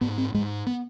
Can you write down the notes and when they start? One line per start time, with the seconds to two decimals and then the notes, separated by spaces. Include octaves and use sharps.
0.01 G#2 B3
0.18 C4
0.34 G#2 G#3
0.67 B3